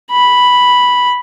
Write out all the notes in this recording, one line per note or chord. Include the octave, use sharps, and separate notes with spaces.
B5